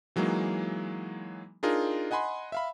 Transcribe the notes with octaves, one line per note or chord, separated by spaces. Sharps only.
E3 F#3 G#3 A#3 D#4
D4 D#4 F4 G#4 A#4
D#5 F#5 G#5 B5 C6
E5 F5 B5